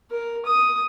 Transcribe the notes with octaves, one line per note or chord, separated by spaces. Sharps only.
A#4
D#6